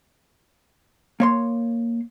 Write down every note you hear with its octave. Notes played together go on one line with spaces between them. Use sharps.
A#3 C#5 C6